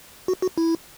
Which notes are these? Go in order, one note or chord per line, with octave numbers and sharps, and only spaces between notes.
F#4
F#4
E4